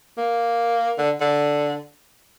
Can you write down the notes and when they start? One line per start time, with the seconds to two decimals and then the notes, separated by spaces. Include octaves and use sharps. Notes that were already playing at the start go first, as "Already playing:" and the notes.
0.17 A#3
0.98 D3
1.21 D3